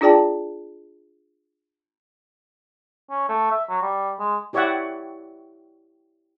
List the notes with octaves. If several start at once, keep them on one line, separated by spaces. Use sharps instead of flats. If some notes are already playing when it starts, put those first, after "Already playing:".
D4 F4 G#4 D5 G5 A5
C#4
A3
E5
F#3
G3
G#3
E4 G4 C#5 D5 E5 F#5